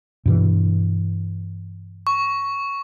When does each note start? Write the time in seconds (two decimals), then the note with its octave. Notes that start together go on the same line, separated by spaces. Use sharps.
0.26 G2 B2 E3
2.07 C#6